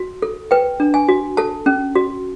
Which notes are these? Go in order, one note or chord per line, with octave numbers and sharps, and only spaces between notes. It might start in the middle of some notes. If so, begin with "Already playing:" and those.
Already playing: F#4
A4
B4 G5
D4
G#5
F#4
A4 A5
C#4
F#4